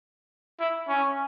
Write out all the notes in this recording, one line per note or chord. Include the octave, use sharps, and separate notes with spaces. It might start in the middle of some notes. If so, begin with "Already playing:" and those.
E4
C#4